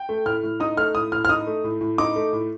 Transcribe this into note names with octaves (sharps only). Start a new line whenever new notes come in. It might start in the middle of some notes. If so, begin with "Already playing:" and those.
Already playing: G5
A3
A2 F6
A2
D#4 D#6
A3 F6
A2 D#6
A2 F6
F6
D#4 D#6
A3
A2
A2
D#4 D6
A3
A2